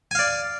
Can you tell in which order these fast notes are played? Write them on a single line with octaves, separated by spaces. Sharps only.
G#5 F5 D5